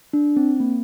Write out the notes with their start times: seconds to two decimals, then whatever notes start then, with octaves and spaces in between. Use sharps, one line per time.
0.13 D4
0.37 C4
0.60 A#3